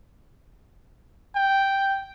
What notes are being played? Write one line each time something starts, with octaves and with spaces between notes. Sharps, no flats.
G5